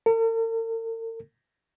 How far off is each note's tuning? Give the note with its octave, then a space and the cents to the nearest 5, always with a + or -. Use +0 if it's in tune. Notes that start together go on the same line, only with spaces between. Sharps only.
A#4 -45